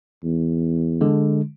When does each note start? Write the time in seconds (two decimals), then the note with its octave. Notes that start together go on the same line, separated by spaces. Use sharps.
0.24 E2
1.01 D3 G#3